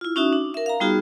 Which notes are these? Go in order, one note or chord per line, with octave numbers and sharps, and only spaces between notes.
E4 F4
C#4 D#4 F#4 E5 D#6
D4
A#4 E5
F5 A#5
G3 B3 D#4 F4 F#4 G#4